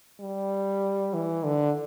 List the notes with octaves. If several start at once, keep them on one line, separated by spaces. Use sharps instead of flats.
G3
E3
D3